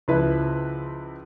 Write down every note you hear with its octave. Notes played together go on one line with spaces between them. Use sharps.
C#2 F3 E4 B4